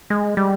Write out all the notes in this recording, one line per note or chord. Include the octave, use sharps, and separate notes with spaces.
G#3
G3